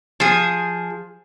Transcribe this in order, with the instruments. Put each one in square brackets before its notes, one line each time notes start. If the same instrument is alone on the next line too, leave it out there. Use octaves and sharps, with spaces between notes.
[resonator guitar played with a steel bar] F3 G#4